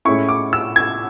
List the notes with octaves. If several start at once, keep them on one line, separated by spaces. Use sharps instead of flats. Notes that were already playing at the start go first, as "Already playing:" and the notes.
A2 G#3 C#4 E4 C#6
D6
E6
G#6